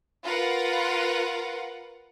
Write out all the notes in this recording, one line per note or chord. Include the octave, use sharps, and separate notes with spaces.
F4 A#4 B4 F5 F#5